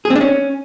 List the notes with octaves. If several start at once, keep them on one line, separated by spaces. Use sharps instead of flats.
G#4
C4
D4
C#4